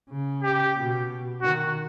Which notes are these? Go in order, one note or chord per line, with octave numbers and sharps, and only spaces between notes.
C#3
G4
B2
D#3 F#4